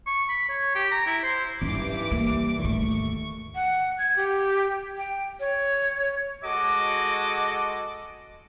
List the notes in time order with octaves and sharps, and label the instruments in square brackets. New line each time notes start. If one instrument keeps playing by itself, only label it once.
[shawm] C#6
B5
C#5
G4
A#5
E4
C5
[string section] G2 E3 D6 [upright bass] C#4 D#4
[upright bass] A#3
[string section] D#2 C#6 [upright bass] G#2 A3
[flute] F#5
G#6
G4
G5
C#5
[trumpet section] G#3 F#4 A4 D#5 D6